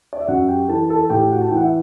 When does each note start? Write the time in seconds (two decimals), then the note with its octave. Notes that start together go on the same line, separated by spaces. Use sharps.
0.13 D5
0.20 E5
0.27 F#2 F#4 F#5
0.48 G4 G5
0.68 E3 A4 A5
0.89 A4 A5
1.10 A2 G4 G5
1.31 F#4 F#5
1.41 A5
1.48 G5
1.51 E3
1.57 F#5
1.64 E5